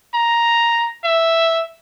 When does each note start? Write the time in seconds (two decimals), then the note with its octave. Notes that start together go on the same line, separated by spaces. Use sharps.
0.14 A#5
1.04 E5